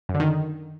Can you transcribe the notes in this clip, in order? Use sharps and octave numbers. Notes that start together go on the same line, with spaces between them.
F#2
D3
D#3